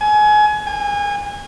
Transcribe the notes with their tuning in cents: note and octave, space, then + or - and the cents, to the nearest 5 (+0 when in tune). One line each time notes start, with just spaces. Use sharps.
G#5 +25
G#5 -30